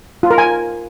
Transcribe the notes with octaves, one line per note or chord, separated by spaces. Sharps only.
F4
A#4
G#5